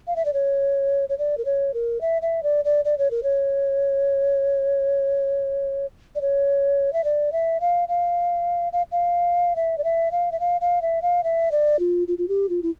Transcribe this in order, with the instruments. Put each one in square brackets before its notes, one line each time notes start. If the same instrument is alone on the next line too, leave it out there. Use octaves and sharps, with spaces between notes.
[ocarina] F5
E5
D5
C#5
C#5
D5
A#4
C#5
A#4
E5
E5
D5
D5
D5
C#5
A#4
C#5
D5
C#5
E5
D5
E5
F5
F5
F5
F5
E5
D5
E5
F5
E5
F5
F5
E5
F5
E5
D5
F4
F4
F4
G4
F4
E4